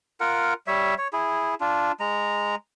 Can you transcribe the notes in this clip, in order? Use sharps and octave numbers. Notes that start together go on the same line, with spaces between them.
F4 A#4 F#5
G3 C#5 E5
C#5
E4 G#4
D4 F4
G#3 A#5